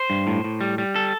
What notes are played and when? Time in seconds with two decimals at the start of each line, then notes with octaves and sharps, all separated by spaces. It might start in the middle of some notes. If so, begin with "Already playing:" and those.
Already playing: C5
0.10 G2
0.27 A2
0.44 A2
0.61 G3
0.78 G3
0.96 A4